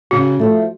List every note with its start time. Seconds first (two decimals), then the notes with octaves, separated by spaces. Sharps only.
0.11 C#3 F#4
0.39 F3 A3